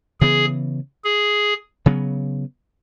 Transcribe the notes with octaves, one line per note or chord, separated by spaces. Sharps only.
C#3 E3 B3 G#4
G#4
C#3 F#3 B3